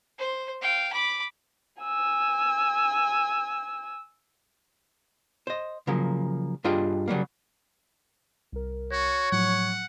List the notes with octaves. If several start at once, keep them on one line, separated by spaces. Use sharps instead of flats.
C5
F5 G5
B5 D6
G#5 E6
C5 D#5
C#3 F3 F#3 A#3
G2 D4 F4 G#4 D#5 G5
C#3 F#3 G3 A#3
C2 A#4
F#4 C#5
A2 F3 F#3 F#5